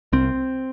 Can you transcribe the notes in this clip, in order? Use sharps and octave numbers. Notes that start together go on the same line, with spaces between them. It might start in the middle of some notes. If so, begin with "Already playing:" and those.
C2 C4